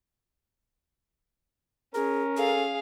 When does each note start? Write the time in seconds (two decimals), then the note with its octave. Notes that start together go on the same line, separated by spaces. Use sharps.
1.94 C#4 G#4 A#4
2.37 G#4 A4 F5